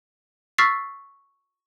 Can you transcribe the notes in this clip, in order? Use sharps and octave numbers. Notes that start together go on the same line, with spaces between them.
C#6 E6 F6 A6 B6 C7